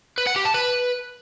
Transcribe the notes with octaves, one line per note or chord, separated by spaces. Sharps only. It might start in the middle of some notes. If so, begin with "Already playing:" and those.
B4
F#5
G4
A5
B4